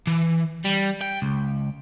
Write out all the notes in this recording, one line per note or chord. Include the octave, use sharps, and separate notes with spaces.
E3
G3
G5
C#2